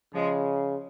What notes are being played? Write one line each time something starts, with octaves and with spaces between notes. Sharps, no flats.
C#3 F3 G#3